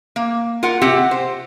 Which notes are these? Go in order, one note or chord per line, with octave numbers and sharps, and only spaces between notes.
A#3
F4 A#4 F#5
C3 C4 G4 F#5
C5